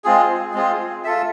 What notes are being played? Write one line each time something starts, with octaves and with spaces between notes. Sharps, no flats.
G#3 C4 F4 G#4
G#3 C4 F4 G#4
F4 A4 E5